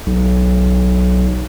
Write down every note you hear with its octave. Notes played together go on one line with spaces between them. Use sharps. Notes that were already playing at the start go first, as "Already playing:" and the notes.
B1